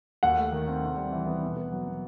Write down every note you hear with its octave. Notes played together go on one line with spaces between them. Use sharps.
D#2 F#5
A3
D#3
C4
C3
G3
E3
B3
B2
B3
F#3
B2